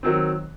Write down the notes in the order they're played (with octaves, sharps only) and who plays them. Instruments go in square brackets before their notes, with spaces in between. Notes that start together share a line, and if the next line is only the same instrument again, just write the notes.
[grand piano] D#3 F#3 C4